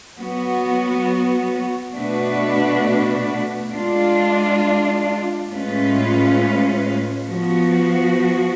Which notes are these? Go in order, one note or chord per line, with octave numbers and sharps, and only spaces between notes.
F#3 B3 F#4
B2 A3 D4 F#4 B4
G#3 D4 F4
A2 G#3 C#4 F4 B4
F3 B3 F#4